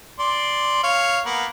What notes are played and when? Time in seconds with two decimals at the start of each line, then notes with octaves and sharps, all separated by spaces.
0.19 D5 C6
0.83 C#5 F5
1.25 A#3 B3 F#5